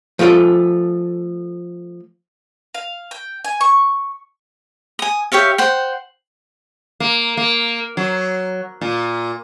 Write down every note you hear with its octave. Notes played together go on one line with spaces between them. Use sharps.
F3 A3 F4 A4 D5
F5
G5
G#5
C#6
G#5 D#6
G4 C#5 E5 F5
C5 F#5 G5
A#3
A#3
F#3
A#2